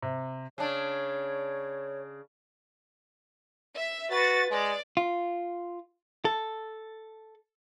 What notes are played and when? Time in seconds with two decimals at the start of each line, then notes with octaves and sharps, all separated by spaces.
0.02 C3
0.58 C#3 D4 C#5
3.75 E5
4.11 F#4 B4 A6
4.50 G#3 D5
4.97 F4
6.25 A4